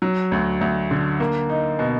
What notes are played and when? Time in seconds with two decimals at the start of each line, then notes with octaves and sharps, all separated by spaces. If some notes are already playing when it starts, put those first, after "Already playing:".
0.02 F#3
0.32 D2
0.61 D2
0.91 D3
1.20 A#3
1.49 D#4
1.79 B2